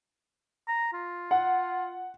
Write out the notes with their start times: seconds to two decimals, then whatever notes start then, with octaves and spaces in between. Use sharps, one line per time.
0.68 A#5
0.93 F4
1.31 F#5